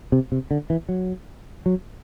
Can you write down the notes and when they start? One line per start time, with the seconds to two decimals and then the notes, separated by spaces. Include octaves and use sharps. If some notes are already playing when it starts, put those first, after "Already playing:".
0.12 C3
0.32 C3
0.51 D3
0.70 E3
0.89 F#3
1.66 F#3